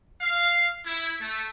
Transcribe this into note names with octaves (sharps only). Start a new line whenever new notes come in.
F5
E4
A3